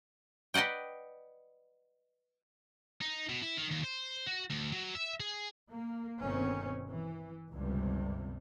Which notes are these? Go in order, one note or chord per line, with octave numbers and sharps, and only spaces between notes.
B4 D5 D#5 F#5 G5
D#4
B2
E4
D#3
D#2
C5
F#4
D2
F#3
E5
G#4
A#3
G1 B2 D#3 C4 C#4
E3
G1 C#2 G2 C3 G3